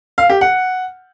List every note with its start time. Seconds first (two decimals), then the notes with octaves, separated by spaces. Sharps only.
0.18 F5
0.30 G4
0.41 F#5